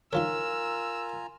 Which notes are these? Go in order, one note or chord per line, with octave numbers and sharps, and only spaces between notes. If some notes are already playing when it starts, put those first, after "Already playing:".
D#3 F3 F4 A#4 C#5 G#5 A#5 E6